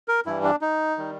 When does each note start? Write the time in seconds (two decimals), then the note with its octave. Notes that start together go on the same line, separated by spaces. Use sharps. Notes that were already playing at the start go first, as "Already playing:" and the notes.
0.08 A#4
0.26 G2 E3 G3 E4
0.43 D4
0.61 D#4
0.97 D#3 G3